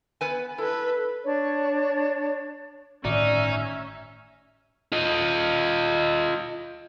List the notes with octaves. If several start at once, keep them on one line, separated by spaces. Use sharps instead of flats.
B3 B4 G#5
E4 A4 B4
D4 C#5
G1 A2 D#3 C#4 D#4 F#4 D5 E5
F4 D#5